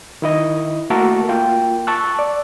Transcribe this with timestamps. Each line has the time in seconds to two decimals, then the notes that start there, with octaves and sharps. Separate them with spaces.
0.22 D#3 E4 D#5
0.90 A3 A#3 F#4 A4 A#4
1.29 A#3 F4 G5
1.87 A5 C#6 E6 F#6
2.19 D5